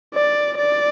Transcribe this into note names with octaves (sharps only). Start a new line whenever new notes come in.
D5
D5